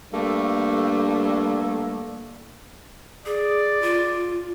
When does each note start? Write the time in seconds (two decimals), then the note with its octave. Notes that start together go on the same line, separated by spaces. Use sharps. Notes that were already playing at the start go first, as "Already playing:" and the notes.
0.12 G2 D3 A3 A#3 A4
3.26 G#4 D5
3.82 F4